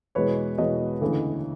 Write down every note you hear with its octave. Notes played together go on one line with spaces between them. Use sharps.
E2 B2 G#3 B4 C#5
E2 B2 G#3 C#5 D#5
D2 C#3 E3 A3